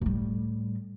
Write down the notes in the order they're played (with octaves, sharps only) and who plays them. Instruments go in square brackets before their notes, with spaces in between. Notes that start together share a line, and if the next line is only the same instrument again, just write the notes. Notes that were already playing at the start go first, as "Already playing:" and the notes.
[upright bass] A2 G3